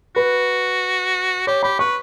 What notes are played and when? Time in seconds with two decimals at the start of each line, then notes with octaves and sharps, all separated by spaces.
0.16 F#4 B4
1.47 G4 C#5
1.63 G4 B5
1.79 B4 C#6